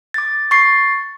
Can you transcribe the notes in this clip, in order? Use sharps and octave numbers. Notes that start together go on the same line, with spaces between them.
D6 A6
C#6 A6 C7